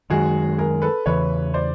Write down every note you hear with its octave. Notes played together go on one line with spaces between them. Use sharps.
F#2 D#3 G#3 F#4 G#4
G#4 A#4
A4 B4
E2 C#3 E3 B4 C#5
C5 D5